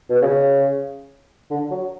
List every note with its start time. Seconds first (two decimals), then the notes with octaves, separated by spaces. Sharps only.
0.10 B2
0.22 C#3
1.51 D3
1.71 F#3